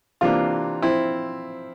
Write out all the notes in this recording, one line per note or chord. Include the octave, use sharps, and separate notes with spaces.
C3 E3 A#3 D4 F4
F3 C4 E4